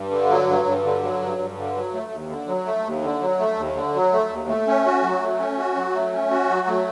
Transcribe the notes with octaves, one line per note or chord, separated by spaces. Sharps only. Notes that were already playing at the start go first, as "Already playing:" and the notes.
Already playing: G2
D3
F#3
G2
G2
D3
F#3
G2
G2
D3
F#3
A3
D#2
D3
F#3
A3
D#2
D3
F#3
A3
D#2
D3
F#3
A3
D#2
A3
C#4
F#4
F#3
A3
C#4
F#4
F#3
A3
C#4
F#4
F#3
A3